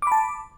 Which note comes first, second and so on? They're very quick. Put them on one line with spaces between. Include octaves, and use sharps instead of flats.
D6 B5 A5